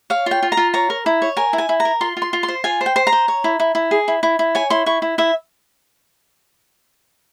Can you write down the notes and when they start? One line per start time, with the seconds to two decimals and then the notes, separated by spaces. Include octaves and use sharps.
0.10 C#5 F5
0.26 F4 G5
0.42 F4
0.52 A#5
0.57 F4
0.74 C#5 A#5
0.90 A#4
1.06 E4
1.22 C#5
1.37 A#4 G#5
1.53 E4
1.58 G#5
1.69 E4
1.80 A#5
1.85 A#4
2.01 F4 C6
2.17 F4
2.22 C6
2.33 F4
2.43 C6
2.48 C5
2.64 F4 G#5
2.81 C5
2.86 G5
2.96 C5
3.07 A#5
3.12 C5
3.28 C#5
3.44 E4
3.60 E4
3.75 E4
3.91 G#4
4.08 E4
4.23 E4
4.39 E4
4.55 C#5 G#5
4.70 E4 C6
4.86 E4 C#6
5.02 E4
5.18 E4 E5